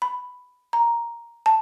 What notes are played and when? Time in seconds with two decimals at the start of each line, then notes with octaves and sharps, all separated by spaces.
0.02 B5
0.73 A#5
1.46 A5